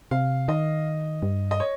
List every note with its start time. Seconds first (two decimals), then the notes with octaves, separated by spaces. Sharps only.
0.11 C3 F5
0.48 D#3 D#5
1.22 G2
1.51 D#5
1.60 C#5